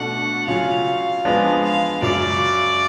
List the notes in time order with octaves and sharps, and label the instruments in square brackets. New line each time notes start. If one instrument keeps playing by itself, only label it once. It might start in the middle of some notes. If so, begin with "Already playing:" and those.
Already playing: [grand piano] B2 A3 D4 F#4 [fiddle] F#5
[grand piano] C#3 F#3 C#4 F4 [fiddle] F5
[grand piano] F3 G#3 B3 D4
[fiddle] F5
[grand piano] F#2 C#3 F#3 [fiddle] D5